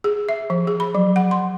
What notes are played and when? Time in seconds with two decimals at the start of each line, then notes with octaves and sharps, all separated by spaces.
0.04 G#4
0.29 E5
0.50 F3
0.67 G#4
0.80 B5
0.95 F#3
1.16 F#5
1.31 C6